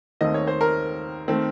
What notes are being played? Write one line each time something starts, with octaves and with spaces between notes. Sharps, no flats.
D#2 D#3 A3 C4 D#5
C#5
C5
A#4
D#3 A3 C4